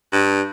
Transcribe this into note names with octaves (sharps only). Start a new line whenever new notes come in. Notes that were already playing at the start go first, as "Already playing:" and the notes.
G2